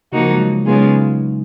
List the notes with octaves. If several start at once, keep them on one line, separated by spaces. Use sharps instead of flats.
C#3 F3 A#3 D#4 F#4
G#3
F#3
C#3 G#3 B3 D#4 F4 G#4